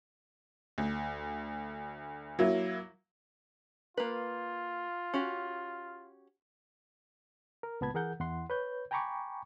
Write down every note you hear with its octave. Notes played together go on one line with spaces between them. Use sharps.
D2
F#3 A#3 E4
A#3 F4 B4
C#4 F#4 G4
A#4
C#2 A#2 B3 A5 B5 G#6
E3 G#4 A#4 F#5 G6
E2 E4 F#5 C6
B4 C#5 G6
G5 G#5 A#5 B5 C#6 D6